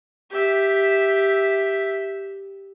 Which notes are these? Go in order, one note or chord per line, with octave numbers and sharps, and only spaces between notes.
G4 E5